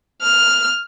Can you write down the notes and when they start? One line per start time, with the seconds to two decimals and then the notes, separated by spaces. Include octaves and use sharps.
0.22 F6